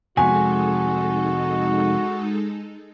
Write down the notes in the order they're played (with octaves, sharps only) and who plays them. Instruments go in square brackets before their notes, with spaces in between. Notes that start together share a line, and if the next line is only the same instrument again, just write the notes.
[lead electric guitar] F2 C3 [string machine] G#3 D#4 A4 [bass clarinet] F#4 [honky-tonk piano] G#5